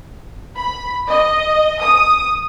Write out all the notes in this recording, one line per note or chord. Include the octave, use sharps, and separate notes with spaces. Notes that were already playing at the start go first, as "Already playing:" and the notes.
B5
D#5
D#6